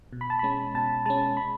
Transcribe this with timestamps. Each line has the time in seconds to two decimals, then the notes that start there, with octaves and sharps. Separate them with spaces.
0.13 B2
0.21 B5
0.30 A5
0.39 G#3 C#4 B5
0.74 B2 A5
1.06 G#3 C#4 A5
1.37 B5